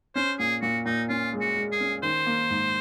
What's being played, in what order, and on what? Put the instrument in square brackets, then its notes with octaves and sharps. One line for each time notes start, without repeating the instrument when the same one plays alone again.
[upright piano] C#4 [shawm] C5
[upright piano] A#2 [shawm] G#4
[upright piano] A#2 [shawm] F#4
[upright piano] A#2 [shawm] D#4
[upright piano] C#4 [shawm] F4
[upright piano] G#3
[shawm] F#4
[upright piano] G#3
[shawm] G#4
[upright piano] C#4
[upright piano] D#3 [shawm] C5
[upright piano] A#3
G#2